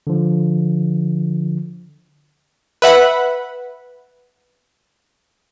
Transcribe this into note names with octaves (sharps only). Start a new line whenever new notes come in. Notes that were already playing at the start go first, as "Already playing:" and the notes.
D3 F3
B4 E5 F#5 B5